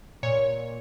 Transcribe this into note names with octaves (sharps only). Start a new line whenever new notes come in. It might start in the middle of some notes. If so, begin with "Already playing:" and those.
A#2 C#5